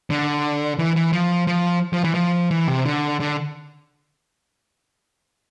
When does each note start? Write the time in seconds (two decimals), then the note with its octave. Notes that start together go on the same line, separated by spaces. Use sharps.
0.10 D3
0.79 E3
0.96 E3
1.13 F3
1.47 F3
1.93 F3
2.04 E3
2.15 F3
2.51 E3
2.67 C3
2.85 D3
3.20 D3